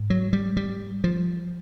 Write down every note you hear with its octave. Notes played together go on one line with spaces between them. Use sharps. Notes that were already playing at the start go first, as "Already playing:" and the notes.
Already playing: G#2
F#3
G3
G3
F3